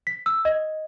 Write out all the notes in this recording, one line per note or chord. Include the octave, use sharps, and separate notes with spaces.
B6
E6
D#5